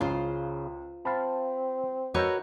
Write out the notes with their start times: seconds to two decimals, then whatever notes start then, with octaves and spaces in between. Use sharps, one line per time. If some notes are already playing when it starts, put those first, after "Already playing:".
0.01 C#2 C#3 F4 C5
1.05 C4 F5 A5 B5
2.14 F#4 A#4 B4 C#5 D#5 E6 G6